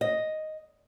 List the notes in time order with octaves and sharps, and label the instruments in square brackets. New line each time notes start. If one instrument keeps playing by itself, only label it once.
[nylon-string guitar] D#5